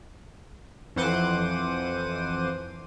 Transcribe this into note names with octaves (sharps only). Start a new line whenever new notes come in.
F2 E3 C5 F#5 D6 D#7